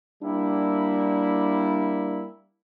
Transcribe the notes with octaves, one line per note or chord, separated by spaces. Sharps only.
G3 A#3 D4 E4